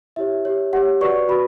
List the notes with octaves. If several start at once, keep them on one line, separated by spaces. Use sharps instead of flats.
E4 G4 C#5 E5
G4 C#5
G4 C#5 F#5
F#4 B4 D5 C#6
F#4 B4 B5